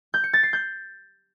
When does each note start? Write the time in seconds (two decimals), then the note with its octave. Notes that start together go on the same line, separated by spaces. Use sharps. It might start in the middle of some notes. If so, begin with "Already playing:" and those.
0.14 G6
0.24 C#7
0.33 A6
0.43 C7
0.53 G6